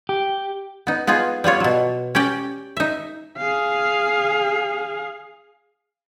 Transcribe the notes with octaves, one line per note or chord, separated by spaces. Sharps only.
G4
B3 D#4
B3 D#4 F4 G#4
G3 B3 F4 C#5
B2 F#3
C#4 G4 D5 G5
D#4 E5
G#4 F5